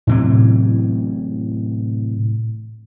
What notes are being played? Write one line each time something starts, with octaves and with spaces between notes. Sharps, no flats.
A2 C3 E3 F#3